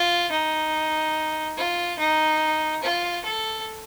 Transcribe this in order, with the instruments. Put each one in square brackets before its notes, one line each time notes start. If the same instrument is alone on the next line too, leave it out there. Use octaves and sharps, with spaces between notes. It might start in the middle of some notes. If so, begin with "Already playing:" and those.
Already playing: [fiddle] F4
D#4
F4
D#4
F4
A4